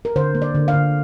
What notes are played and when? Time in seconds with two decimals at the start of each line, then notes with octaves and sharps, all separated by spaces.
0.05 A#4
0.16 D3 C5
0.35 A#3
0.42 D5
0.55 D3
0.68 F5
0.74 D3